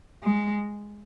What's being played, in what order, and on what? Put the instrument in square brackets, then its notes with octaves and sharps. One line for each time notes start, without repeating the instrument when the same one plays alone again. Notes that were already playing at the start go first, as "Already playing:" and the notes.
[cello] G#3